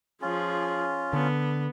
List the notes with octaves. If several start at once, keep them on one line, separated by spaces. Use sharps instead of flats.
F3 C#4 F4 G#4
D3 B3